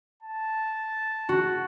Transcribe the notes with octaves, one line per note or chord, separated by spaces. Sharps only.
A5
F#4